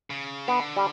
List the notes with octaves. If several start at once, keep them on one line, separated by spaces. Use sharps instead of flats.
C#3
D3 B3
G3